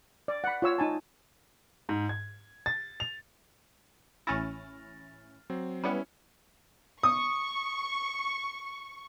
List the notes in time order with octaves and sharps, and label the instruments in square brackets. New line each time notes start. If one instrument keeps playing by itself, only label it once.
[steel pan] D5
F#5 B5
F4 C#5 E6
D#4 G#5 A5
[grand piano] G#2
G#6
A6
F7
[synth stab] A1 C#4 E4 [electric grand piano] F6 A6 A#6
[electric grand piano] F#3 C4
[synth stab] G3 B3 [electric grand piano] C#4 E4 C#7
[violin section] C#6 [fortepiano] D#6